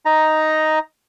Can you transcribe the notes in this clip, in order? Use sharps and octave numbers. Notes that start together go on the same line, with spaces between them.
D#4 A#5